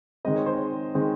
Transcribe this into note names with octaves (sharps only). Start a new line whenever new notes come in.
D#3 G#3 C4 D#5
C#5
C5
C#5
D#3 G#3 C4